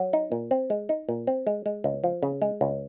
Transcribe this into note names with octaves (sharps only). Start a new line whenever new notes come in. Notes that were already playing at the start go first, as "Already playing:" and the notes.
Already playing: F#3
D#4
A#2
C4
G#3
D#4
A#2
C4
G#3
G#3
C#2
F3
C#3
G#3
C#2